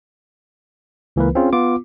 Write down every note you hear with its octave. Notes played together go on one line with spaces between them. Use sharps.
C#2 E3 A#3 A#4 B4
C4 C#4 F4 G#4
B3 F4 D6